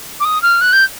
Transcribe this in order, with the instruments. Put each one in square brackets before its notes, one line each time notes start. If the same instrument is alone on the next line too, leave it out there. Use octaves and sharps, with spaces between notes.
[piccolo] D6
D#6
F6
F#6
G6